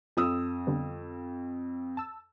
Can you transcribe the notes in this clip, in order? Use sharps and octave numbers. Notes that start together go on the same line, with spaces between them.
F2 F3 D#6 E6
D3 G3 B3
A5 E6